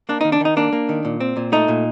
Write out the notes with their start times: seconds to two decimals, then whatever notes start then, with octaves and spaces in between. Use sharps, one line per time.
0.09 A#3 D4
0.21 D#4
0.24 D#3
0.32 D4
0.41 D#3 D#4
0.57 A#3 D4
0.73 A#3
0.89 D#3
1.05 A#2
1.20 C4
1.37 A#2
1.52 A3 D#4
1.68 A#2